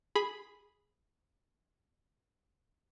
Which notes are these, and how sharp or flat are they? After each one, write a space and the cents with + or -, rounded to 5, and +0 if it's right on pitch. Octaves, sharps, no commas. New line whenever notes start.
G#4 +0 B5 +0